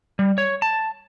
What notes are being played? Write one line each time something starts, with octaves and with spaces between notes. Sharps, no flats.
G3
C#5
A5